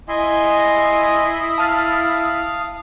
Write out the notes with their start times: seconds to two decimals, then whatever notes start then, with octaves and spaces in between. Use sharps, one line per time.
0.08 E4 D#5 G#5 C6 D#6
1.58 F5 A5 F6 A6